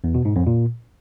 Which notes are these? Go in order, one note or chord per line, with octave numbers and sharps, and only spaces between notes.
E2
B2
G#2
F2
A#2